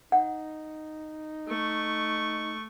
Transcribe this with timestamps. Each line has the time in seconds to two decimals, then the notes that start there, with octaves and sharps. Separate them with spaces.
0.12 D#4 F#5
1.48 A3 C#6